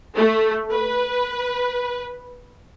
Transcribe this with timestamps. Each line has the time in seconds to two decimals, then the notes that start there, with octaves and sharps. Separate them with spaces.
0.16 A3
0.71 B4